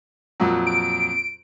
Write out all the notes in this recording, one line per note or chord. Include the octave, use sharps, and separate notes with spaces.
F2 A#2 F#3
D7